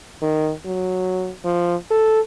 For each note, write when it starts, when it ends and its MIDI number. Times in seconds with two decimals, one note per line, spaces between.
0.22 0.52 51
0.65 1.32 54
1.45 1.75 53
1.91 2.20 69